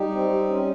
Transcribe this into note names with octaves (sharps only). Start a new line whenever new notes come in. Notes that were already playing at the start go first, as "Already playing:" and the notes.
Already playing: G3 D#4 G4
C4
G3
C#4